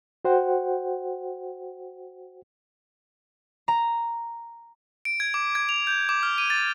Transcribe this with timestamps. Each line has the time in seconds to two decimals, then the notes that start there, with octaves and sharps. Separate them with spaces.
0.25 F#4 C5 F#5 G5
3.68 A#5
5.05 D7
5.20 G#6
5.34 D6
5.55 G#6
5.69 F7
5.87 G6
6.09 D6
6.23 F6
6.38 D#7
6.50 A6